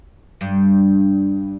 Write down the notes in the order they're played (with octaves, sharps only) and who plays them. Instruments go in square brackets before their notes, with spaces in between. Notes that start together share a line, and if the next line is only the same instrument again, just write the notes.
[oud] G2